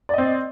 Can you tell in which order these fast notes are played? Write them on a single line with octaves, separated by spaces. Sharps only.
D5 D#5 C4